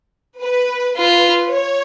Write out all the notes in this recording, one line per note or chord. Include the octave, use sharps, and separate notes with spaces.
B4
F4 B4
C#5